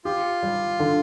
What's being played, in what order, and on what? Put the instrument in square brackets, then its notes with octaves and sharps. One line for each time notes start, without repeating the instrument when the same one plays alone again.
[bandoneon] F4 [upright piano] G4
[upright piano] G3
D3